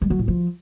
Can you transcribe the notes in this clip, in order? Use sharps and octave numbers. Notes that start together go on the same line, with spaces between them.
G3
F#3
A2
F3